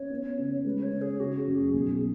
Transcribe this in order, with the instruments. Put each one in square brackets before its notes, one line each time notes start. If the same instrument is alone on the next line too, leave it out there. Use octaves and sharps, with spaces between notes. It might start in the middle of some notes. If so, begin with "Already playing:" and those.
Already playing: [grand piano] C#4 [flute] C#5
[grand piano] B3
C#3
[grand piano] G#3 [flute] B4
[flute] C#5
[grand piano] C#3
[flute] G#4
[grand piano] C#3 [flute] F#4
[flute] F#4
[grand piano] F#2
[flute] G#4
[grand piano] B1 [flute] G#4